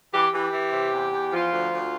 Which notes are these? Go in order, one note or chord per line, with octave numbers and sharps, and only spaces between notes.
E3 G4
E3 G4
E3
C3
E2
E2
F3 F4
D2
D2